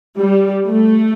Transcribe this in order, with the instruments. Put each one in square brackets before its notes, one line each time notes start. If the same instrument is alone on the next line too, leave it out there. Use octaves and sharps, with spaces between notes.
[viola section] G3
A3